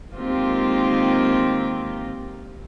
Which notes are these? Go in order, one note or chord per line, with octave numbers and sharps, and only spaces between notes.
D#3 G#3 A#3 C4 F4 G4